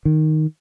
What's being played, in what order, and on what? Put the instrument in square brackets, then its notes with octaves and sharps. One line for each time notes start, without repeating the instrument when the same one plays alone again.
[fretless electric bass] D#3